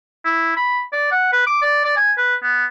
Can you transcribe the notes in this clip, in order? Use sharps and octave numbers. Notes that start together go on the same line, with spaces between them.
E4
B5
D5
F#5
B4
D6
D5
D5
G#5
B4
B3